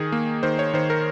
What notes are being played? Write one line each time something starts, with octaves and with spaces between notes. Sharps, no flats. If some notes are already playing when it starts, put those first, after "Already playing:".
Already playing: D#3 G#4
A#3
D#3 C5
C#5
D#3 C5
A#4